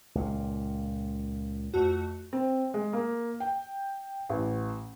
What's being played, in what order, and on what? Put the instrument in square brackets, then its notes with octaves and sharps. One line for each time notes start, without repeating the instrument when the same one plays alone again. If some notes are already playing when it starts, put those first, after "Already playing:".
[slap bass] C#2 A#2
[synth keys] F2 A3 F#4
[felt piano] C4
G#3
A#3
G5
A1